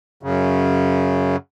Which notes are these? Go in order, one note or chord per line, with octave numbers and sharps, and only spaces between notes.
F#2 C#3